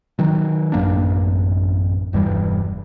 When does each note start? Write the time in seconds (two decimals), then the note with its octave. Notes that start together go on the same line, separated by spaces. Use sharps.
0.19 D#3 F#3
0.72 A1 F#2 A#3 D4
2.13 E1 G2 E3 G3